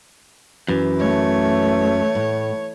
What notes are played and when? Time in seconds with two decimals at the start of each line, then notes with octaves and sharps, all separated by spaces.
0.68 F#2 E3
1.00 A3 C#5
2.15 A2